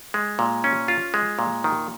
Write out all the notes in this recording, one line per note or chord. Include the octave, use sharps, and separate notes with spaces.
G#3
A#2
C#4
F4
G#3
A#2
D#3